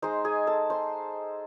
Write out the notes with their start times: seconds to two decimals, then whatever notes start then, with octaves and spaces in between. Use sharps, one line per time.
0.02 G#3 D#4 C5 C6
0.25 G#4 G#5
0.47 A4 A5
0.70 C5 C6